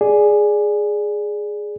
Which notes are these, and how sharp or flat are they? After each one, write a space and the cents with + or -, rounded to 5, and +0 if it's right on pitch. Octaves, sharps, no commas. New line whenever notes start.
G#4 +0 D5 +0